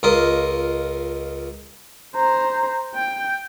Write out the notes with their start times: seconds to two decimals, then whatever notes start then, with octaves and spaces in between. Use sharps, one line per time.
0.03 C#2 F4 A#4 D#5
2.16 C5 A#5
2.95 G5